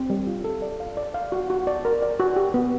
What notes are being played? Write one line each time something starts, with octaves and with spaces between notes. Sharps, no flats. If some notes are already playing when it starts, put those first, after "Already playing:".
Already playing: C4
G3
F4
A4
D5
F5
D5
F5
F#4
F#4
D5
A#4
D5
F#4
G4
B3